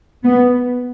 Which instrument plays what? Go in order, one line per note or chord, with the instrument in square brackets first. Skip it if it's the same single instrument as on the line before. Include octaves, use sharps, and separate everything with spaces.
[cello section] B3